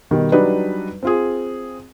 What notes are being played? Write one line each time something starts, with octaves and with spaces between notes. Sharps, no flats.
B2 D#3 G3
F#3 G3 D4 D#4 B4 D5
C4 F4 G#4